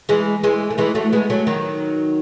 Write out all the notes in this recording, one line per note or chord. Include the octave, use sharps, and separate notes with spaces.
E3 G#3
E3 G#3
A3
E3 G#3
F#3 A3
G#3 B3
F#3 A3
D#3 F#3